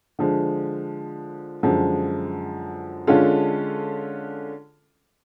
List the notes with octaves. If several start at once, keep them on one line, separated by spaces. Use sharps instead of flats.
D3 F3 G#3
F#2 D3 F3 G#3
D3 G#3 C#4 F4 A4